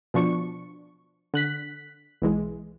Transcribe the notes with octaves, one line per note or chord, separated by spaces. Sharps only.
B2 F3 D4 C#6
D3 F#6 B6
B1 E3 G#3